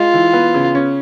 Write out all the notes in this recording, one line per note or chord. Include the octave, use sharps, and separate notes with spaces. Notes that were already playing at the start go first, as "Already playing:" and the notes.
Already playing: G#3 F4
E3
B3
C#3
C#4